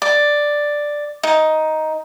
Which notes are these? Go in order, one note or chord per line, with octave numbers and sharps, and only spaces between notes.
D5
D#4